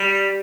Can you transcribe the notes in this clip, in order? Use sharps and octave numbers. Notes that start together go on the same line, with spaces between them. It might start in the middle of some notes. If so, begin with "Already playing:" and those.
Already playing: G3